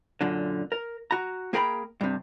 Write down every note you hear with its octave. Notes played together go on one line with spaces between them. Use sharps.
F#2 A#2 D3
A#4
F#4 A#5
A#3 G#4 A#4 G5 A#5 B5
G2 C3